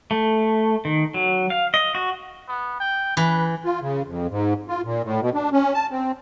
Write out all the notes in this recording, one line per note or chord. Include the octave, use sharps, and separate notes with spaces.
A3
D#3
F#3
F5
D#5
F#4
B3
G5
E3 B4
F4
C#3
F2
G#2
F4
A#2
A2
B2
D4
C#4
A5
C4